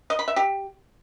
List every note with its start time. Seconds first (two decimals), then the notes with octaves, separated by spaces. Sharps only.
0.10 D#5
0.19 B5
0.28 E5
0.36 G4